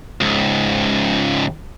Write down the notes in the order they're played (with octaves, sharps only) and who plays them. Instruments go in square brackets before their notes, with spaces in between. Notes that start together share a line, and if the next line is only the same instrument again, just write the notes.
[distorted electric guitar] C#2 G#2